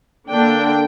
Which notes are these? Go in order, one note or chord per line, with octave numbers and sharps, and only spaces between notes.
D3 A#3 D4 G5